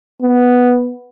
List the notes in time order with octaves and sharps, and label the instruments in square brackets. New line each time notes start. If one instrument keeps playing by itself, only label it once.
[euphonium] B3